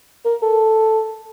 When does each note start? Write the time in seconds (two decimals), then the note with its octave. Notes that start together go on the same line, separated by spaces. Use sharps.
0.25 A#4
0.42 A4